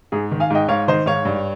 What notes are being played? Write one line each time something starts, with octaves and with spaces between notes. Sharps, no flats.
G#2 G#4
D#3
F5 G#5
G#2 D#5 G5
G#2 C#5 F5
D#3 C5 D#5
G#2 C#5 F5
G2